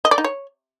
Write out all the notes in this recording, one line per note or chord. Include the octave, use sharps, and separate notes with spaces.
D#5
D5
D#4
C#5